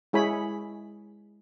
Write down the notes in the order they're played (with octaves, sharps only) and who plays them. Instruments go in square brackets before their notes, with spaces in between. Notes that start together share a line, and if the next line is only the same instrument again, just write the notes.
[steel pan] G#3 E4 G#4 C#5 G#5 B5